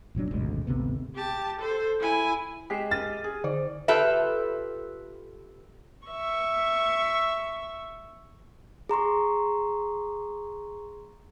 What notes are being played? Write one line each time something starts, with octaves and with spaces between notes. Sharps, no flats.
F1 A#2 F#3 D4
G#1 D2 B2 G#3
G#1 D2 C3 B3
G4 A5
A4 C5
E4 G#5
G#3 G4 B6 C7 E7
F6 A6 D#7
G#4
D3 C5 D5
F4 G4 A4 B4 E5
E5 C#6
G#4 A#5 C6 C#6